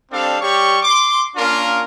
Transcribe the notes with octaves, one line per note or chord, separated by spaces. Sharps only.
G3 C4 D4 A4 F5
G3 G4 C#5 C#6
C6 D6
A#3 C#4 D4 F4 A#4